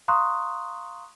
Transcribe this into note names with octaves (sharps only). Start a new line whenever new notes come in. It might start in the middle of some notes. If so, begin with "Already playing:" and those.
F5 A#5 C6 C#6 D#6 F#6